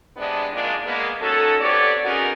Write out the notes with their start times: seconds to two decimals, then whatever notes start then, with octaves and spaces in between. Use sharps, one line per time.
0.17 C3 G#3 B3 D4
0.53 D#3 F#3 G#3 A#3 D4 F4
0.86 G#3 A#3 B3
1.21 C#4 D#4 F#4 A4
1.61 B3 C4 G4 C#5 D5
2.04 B3 C#4 D#4 F#4 G#4 A#4